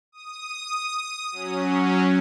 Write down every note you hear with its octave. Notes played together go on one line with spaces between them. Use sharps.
D#6
F#3 C#4